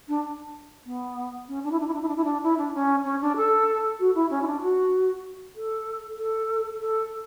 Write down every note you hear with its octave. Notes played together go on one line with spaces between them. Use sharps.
D4
B3
C#4
D4
E4
D4
E4
D4
E4
D4
E4
D4
E4
D4
C#4
C#4
D4
A4
F#4
E4
C#4
E4
D4
F#4
A4
A4
A4